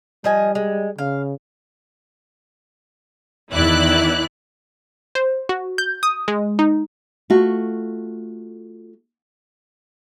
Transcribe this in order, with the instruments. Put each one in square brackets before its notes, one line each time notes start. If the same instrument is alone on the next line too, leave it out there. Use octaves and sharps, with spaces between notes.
[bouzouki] F3 D#5 G#5 [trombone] G3
[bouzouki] G#3
[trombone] C#3 [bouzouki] F5
[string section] E2 D#3 E4 D5 F#6
[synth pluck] C5
F#4
G6
D#6
G#3
D#4
[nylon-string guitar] A3 F4 F#4